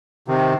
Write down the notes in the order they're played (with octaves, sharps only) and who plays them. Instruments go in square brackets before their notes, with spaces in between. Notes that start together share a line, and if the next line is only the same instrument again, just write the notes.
[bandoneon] C3 D#3